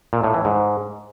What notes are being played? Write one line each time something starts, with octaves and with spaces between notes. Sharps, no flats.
A#2
A2
E3
G#2